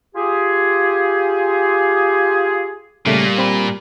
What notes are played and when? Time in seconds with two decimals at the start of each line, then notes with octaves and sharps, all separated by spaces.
0.16 F4 G4 G#4
3.06 A#2 C#3 G3 A3 A#3
3.38 C4 B5